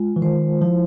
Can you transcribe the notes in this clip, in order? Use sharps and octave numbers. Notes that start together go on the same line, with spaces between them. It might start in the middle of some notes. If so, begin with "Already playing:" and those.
Already playing: G#3 F4
E3
D#3 C5
F3 E4